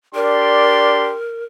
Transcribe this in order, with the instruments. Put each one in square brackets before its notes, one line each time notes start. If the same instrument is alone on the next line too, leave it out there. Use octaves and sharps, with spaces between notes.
[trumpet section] D4 G4 C6 [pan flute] A#4 [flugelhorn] D5